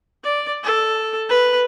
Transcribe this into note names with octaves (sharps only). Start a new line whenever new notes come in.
D5
A4
B4